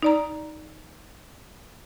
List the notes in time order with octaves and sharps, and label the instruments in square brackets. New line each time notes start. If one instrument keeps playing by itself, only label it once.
[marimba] D#4 D5 A#5